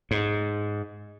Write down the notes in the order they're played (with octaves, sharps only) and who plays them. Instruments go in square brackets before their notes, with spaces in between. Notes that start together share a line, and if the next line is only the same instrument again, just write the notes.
[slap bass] G#2